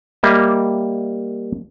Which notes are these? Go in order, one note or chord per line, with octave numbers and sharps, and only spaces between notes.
G3 A#3 D#5 E5